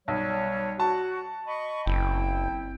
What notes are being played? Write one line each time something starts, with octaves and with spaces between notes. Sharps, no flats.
B1 G3 C#5
F#4 A5
D#5 B5 C#6
F#1 C4 E4 G5